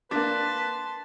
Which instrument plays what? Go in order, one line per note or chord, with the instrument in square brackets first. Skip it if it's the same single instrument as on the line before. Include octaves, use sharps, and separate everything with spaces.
[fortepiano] A#3 D4 [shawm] B4 [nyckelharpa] A5 C6